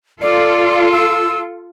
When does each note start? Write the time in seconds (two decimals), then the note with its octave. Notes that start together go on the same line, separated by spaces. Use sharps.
0.22 F4 A4 D5
0.92 E6